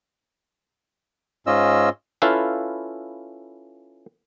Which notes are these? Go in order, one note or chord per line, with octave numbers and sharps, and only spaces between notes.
G#2 C#4 F4 D#5 E6
C#4 E4 F4 A4 B4 F5